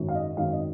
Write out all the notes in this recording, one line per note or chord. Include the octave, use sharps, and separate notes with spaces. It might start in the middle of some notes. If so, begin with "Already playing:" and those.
Already playing: G#1 F#2 D#3
F5
D#5
G#1 F#2 D#3 F5
D#5